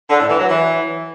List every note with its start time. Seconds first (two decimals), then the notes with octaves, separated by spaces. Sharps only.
0.10 D3
0.19 A2
0.29 E3
0.39 F#3
0.49 E3